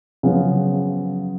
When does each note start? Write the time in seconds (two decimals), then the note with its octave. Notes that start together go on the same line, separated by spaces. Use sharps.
0.23 F#2 C#3 F3 B3